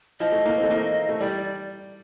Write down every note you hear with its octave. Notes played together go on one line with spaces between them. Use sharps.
F3 D#5
A3
A#3
C4
A3
A#3
A3
G3 D5